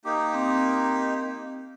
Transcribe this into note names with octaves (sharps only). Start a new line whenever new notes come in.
A#3 D#4 G4 D6 D#6
C4